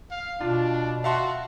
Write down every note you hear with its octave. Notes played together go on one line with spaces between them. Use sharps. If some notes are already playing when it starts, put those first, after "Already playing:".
F5
B2 D4 F4
F#4 E5 F5 A5 C6